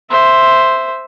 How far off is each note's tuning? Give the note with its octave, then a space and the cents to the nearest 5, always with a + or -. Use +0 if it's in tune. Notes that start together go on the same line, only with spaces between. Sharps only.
C5 +0 E5 +0